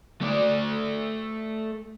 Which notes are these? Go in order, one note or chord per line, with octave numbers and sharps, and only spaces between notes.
A3 D5